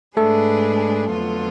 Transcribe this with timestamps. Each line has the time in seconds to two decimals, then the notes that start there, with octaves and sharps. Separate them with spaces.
0.17 G#2 G#3 A3 D4 G#4 A4 B4
1.10 F2 D3 F#3 B3 F4